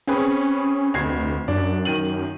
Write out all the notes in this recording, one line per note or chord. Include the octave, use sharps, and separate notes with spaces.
C4 C#4 G#4 B4
F1 D2 G#6 C7
F#2 D4
D#3 D#7 F#7